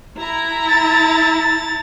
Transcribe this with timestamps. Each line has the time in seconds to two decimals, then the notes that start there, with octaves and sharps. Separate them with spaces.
0.16 E4 A#5
0.68 A6